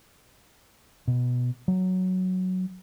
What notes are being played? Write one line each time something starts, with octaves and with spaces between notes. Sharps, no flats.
B2
F#3